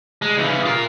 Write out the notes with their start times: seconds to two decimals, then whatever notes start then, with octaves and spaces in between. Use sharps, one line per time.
0.22 G#3
0.38 C#3 E3
0.66 F4 A#4